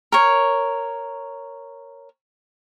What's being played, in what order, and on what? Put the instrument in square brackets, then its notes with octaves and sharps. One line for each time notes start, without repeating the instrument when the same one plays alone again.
[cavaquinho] A#4 C#5